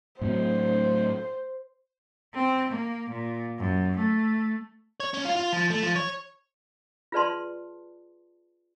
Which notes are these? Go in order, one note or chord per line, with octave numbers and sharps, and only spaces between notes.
A2 F#3 C4 C5
C4
A#3
A#2
F#2
A3
C#5
C#4
F4
F4
F3
A3
F3
C#5
F4 G#4 B4 D5 A5 C6